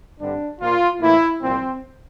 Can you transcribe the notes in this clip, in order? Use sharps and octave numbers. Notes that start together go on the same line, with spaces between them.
G2 D3 G3 C4 D4
A#2 F3 A#3 F4
A2 E3 A#3 E4
C2 A#2 F3 C4